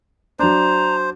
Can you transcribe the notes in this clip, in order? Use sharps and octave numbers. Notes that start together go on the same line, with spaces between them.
F#3 D4 C5 A#5